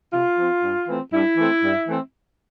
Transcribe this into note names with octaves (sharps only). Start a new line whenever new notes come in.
C3 F4
F3 C4
G2
E3 A3 C4
G2 E4
E3 A3 C4
G2
E3 A3 C4